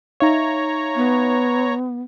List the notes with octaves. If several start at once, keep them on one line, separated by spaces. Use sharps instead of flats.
D#4 C#5 E5 F5 A#5
B3